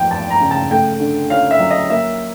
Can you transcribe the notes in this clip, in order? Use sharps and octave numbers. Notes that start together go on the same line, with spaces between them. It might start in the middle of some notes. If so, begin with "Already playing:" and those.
Already playing: E2 F3 G5
E2 A5
A#5
C#3
A5
A3 G5
D3
C#4 F5
E5
F#3
D#5
A#3 E5